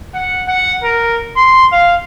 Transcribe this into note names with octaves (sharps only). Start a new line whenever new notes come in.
F#5
F#5
A#4
C6
F5